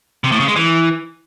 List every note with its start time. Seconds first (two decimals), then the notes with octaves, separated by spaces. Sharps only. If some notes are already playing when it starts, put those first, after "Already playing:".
0.24 C3
0.32 A2
0.40 C#3
0.48 G#3
0.56 E3